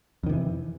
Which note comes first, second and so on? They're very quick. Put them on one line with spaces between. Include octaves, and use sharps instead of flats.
F2 D#3 C3 E3